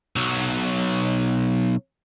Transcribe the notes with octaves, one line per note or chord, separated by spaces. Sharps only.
B1 F#3